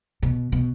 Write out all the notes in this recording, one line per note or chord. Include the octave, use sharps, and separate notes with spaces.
B2
B2